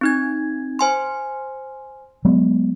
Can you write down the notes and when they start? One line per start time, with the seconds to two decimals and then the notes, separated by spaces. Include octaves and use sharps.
0.01 C4 D#4 G#6
0.79 C5 G#5 C6
2.25 F#3 G#3 B3